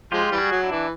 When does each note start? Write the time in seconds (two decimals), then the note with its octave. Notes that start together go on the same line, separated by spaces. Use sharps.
0.12 F3 G#3 F4 G4
0.32 E3 G3
0.38 F#4 G#4
0.51 F#3
0.63 D4 E4
0.71 E3